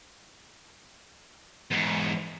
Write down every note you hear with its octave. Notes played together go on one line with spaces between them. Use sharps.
E2 G#2